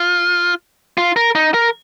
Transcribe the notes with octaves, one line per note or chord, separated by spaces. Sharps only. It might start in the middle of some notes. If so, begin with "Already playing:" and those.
Already playing: F4
F4
A#4
D#4
A#4